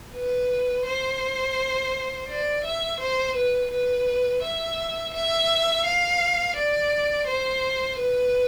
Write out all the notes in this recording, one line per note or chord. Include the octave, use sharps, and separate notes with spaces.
B4
C5
D5
E5
C5
B4
B4
E5
E5
F5
D5
C5
B4